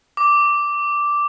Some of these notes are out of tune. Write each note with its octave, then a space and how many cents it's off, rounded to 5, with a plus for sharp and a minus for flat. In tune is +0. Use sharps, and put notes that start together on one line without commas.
D6 -5